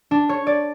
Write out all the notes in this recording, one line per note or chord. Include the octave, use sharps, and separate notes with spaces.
D4
C#5
D5